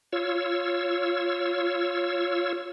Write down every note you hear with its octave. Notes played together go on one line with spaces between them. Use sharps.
F4 C#5 E6